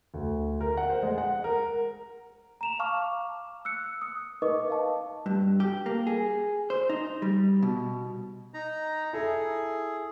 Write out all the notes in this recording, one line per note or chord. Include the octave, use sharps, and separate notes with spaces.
D2
A#4
F#5
C5
G#3
F#5
A#4
A#5 E7 F7
F5 A5 C#6 D6 F6
E6 F#6 C#7
D#6
D#4 A#4 B4 D#5 C#6 D6
D#5 F5 A5
G2
G4
A#3
G#4
C5
D#4
G3
B2
D#4 A#5
E4 G#4 A4